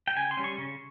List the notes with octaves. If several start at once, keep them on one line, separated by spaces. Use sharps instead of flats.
G5
C#3 G#5
C6
G3 C#4
C#6
C#3